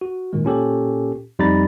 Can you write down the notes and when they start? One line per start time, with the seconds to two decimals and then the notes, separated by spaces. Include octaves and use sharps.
0.01 F#4
0.33 A#2 D#3 G#3
0.45 A#2 C#4 G4 A4
1.39 F2 G3 D#4 A#5 B5 A6